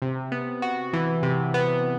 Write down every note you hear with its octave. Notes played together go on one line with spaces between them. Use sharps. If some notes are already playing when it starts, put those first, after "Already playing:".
C3
B3
F#4
E3
C3
B3